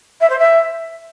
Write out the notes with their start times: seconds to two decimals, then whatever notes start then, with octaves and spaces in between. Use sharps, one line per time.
0.20 E5
0.30 C5
0.39 E5